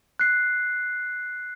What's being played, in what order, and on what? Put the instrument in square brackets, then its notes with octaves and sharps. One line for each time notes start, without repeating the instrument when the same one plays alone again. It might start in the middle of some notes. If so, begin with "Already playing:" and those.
[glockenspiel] F#6 C7